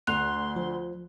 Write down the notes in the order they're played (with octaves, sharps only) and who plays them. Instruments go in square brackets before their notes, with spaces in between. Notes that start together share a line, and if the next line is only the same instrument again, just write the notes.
[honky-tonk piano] D2 [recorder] C6 [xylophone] F#6 F7
[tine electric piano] F3